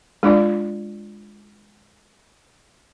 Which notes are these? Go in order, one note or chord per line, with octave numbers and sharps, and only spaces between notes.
G#3 D4 F4 D5